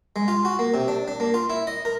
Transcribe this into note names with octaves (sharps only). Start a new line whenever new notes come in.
G#3
F4
F#4
A#3
C3
D4
D4
A#3
F4
E4
D#5
A#4